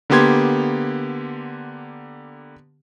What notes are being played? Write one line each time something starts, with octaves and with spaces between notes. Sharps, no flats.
D3 A#3 B3 G4 C6 G#6